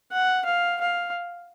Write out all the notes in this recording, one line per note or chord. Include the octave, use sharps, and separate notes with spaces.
F#5
F5
F5